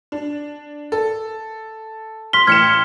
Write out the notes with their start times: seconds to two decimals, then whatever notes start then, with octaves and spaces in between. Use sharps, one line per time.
0.12 D4
0.92 A4
2.33 C6 F6 B6 G7
2.47 A1 F6 G#6 C#7 E7